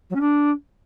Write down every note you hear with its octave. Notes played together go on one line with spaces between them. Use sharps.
F#3
C#4
D4